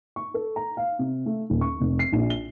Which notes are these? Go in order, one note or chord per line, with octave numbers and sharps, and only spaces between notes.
C#6
A4
A#5
F5
C3
A3
D#1
C#6
F1
C7
A#1
G7